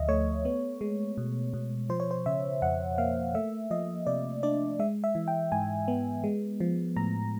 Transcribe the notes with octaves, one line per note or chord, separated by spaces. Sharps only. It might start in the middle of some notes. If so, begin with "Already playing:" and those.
Already playing: D2 F3 D#5 E5
A3 C#5
B3
G#3
B2
B2
F3 C5
C#5
C5
C#3 E5
F2 F#5
A#3 F5
A3 E5
F3 D#5
C3 D5
D4 D5
G#3 E5
E5
E3
G5
G#2 G#5
B3
G#3
F3
A2 A#5